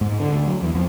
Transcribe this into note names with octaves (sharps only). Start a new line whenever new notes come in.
G#2
D3
D2
F#3
E2
F2